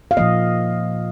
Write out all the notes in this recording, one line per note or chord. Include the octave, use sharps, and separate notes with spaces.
F5
A#2 F3 A#3 D#5